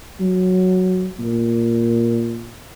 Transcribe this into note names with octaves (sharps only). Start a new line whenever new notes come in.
F#3
A#2